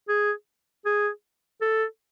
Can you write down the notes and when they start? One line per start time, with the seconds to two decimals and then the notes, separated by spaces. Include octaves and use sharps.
0.09 G#4
0.86 G#4
1.61 A4